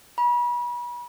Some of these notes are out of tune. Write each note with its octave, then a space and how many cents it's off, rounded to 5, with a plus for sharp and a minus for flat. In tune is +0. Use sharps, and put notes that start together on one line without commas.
B5 -35